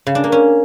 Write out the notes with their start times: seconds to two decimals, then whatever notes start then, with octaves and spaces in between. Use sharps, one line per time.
0.07 C#3
0.15 D4
0.24 A#3
0.32 C#4